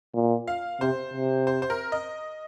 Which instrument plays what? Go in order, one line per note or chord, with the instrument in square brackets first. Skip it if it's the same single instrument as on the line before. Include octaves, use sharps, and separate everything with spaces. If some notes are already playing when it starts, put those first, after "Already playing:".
[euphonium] A#2
[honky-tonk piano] F5
[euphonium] C3 [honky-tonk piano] C5
[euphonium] C3
[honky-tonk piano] C5
C5
A#4
D#5